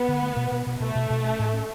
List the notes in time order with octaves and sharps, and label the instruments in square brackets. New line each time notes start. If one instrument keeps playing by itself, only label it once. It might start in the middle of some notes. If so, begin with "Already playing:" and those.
Already playing: [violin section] B3
[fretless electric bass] D3
A3
B2
B2
B2
[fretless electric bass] B2 [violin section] A3
[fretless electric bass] B2
B2
C#4
A2
C#4